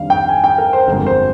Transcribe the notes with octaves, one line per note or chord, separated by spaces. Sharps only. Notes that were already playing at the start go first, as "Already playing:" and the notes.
Already playing: F2 D#3 G3 A#3 D4 F5
G5
G#5
G5
A#4
C5
G1 F2 D3 F3 G#3 A#4
C5